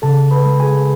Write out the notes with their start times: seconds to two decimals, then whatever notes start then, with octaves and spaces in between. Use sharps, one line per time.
0.02 C#3 A4 A5
0.31 B4 B5
0.45 G#3
0.60 G#4 G#5